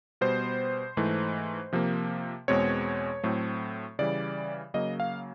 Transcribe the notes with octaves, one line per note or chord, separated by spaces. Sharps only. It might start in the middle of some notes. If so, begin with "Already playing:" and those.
B2 G3 B3 C5
G#2 E3 A3
C3 F3 A#3
E2 B2 G#3 C4 C#5
A2 F#3 A3 C4
C#3 E3 G3 D5
C#3 F#3 A#3 D#5
F5